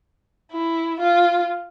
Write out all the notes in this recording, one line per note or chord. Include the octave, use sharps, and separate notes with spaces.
E4
F4